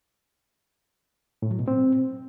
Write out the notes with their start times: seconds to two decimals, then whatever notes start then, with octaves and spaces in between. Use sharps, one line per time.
1.42 A2
1.51 F#3
1.59 B2
1.68 C4